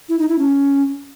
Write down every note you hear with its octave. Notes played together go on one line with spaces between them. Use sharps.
E4
D#4
E4
C#4